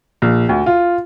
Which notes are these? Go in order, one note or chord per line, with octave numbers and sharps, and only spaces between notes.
A#1
D2
F4